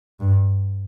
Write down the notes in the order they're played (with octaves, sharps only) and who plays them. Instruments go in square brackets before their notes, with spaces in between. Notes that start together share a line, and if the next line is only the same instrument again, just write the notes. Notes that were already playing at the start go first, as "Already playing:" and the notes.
[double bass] G2